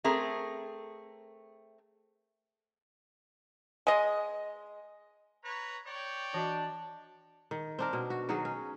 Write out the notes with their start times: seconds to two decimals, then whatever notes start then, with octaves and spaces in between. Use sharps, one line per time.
0.04 A3 C4 G#4 A#4
3.87 G#3 D#5
5.44 B4 C#5 A#5
5.87 C#5 D5 G5
6.34 E3 D4 F#4 D#5
7.51 D#3
7.79 C4 D4 A#4
7.93 B2
8.10 F#4
8.29 D#3 F#3 F#4 G#4
8.45 C#4